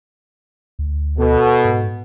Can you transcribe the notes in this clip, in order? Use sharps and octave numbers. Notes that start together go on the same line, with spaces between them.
D2
B2 A4
G#2